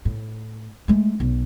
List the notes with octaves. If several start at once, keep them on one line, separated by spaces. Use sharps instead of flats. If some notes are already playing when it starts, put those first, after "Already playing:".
A2
G#3 A3
B1